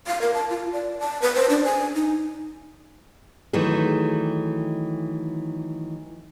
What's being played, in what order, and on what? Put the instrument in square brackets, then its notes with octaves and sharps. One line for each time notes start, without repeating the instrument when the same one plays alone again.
[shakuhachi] F5
A#4
A5
F4
D5
A5
B4
C5
D4
G#5
D#4
[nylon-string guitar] D#3 E3 F#3 A3 G#4